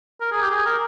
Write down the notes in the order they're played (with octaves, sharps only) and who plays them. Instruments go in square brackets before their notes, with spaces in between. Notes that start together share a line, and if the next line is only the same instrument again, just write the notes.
[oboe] A#4
G#4
G4
G#4
A#4